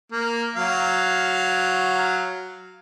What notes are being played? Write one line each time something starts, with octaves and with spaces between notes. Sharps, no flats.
A#3
F#3 F5